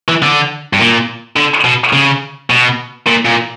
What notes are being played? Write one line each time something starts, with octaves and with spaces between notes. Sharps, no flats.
E3
D3
G2
A#2
D3
B2
C#3
B2
A#2
A#2